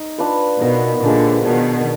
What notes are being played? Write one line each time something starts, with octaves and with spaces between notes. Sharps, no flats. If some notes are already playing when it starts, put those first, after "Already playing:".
Already playing: D#4 D#5
D4 F4 B4
B2 B3 D#4 A#4 D#5
A#2 D3 F3 G#3 D4
B2 D#3 D4 F#4 A#4 D5